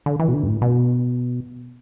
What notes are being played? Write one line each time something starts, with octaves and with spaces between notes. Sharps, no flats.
D3
E3
B2
D3
F#2
A2
B2